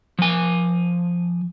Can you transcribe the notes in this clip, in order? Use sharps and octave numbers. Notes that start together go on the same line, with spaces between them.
F3 G#5